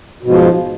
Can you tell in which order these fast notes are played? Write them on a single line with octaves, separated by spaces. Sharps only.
B2 G#2 F3